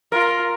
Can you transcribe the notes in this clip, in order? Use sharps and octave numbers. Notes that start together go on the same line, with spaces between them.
F4 A#4